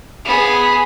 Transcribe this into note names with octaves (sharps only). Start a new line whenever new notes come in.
B3 G#4